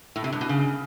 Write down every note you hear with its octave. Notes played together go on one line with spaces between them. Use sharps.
A2
C3
G2
B2
C#3